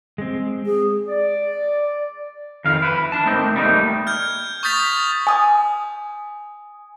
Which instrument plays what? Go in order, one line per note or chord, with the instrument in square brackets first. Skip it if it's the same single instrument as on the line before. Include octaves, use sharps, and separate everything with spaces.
[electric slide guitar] G#3 C4
[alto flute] G#4
[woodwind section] D5
[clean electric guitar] F2 D#3 F5
E4 B4
D4 A5
A3 A#3 C4 D#4
G3 A3 A#3 D4 D#4
[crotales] F6 G6 G#6
C#6 D#6 G6 A6 B6 F7
[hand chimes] G#5 D#6